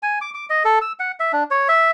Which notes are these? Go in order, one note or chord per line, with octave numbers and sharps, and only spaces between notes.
G#5
D6
D6
D#5
A4
E6
F#5
E5
D4
C#5
E5